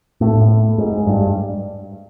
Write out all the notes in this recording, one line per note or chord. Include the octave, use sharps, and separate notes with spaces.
A2
G#2
G2